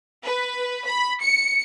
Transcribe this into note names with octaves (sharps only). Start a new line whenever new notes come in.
B4
B5
C#7